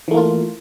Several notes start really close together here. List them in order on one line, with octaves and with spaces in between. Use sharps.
E3 A3 A#3 F4